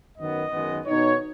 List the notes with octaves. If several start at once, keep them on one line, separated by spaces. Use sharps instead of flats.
F#2 D#3 B3 D#5
F#2 D#3 G#3 B3
B2 B3 D#4 C#5